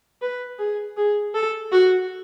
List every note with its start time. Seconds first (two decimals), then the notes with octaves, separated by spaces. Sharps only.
0.22 B4
0.59 G#4
0.97 G#4
1.35 A4
1.72 F#4